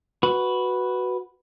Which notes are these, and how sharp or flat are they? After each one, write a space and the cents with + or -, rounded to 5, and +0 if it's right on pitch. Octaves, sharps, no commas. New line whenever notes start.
F#4 +0 B4 +0